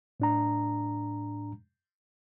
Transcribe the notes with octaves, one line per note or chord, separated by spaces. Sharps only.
A2 D4 A#5